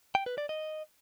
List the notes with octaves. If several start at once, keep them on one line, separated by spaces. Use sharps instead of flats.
G5
B4
D5
D#5